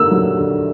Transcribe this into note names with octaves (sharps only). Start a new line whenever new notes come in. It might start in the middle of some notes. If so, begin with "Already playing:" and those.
Already playing: D3 A#3 E6
F#3
D3